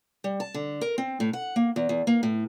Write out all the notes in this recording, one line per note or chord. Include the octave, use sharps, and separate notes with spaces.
G3
A5
D3
A#4
C4
A2
F#5
A#3
E2
E2
A#3
A2